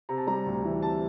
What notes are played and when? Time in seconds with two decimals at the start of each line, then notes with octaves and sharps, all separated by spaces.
0.09 C3 A#5
0.17 A5
0.27 G3 A#5
0.46 D2
0.64 E3
0.82 C3 A5